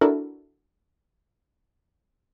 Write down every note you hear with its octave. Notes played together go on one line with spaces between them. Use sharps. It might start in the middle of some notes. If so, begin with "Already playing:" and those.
D4 E4 F#4 A4 A#4